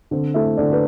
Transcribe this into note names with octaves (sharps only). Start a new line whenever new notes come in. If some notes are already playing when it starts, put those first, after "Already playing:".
D3 C4 C5
A3 E4 E5
D3 D4 D5
B4